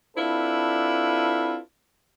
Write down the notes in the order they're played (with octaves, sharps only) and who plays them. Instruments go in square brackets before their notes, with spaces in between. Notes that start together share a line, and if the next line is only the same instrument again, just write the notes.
[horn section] C4 D4 E4 F4 A4 B4